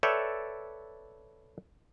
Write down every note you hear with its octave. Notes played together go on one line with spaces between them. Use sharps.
A4 B4 C#5 D5 E5 G5